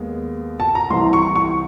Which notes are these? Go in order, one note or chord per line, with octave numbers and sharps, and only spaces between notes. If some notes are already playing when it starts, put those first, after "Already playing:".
Already playing: D#2 G#3 B3
A5
A#5
C2 C3 E3 C6
C#6
C#6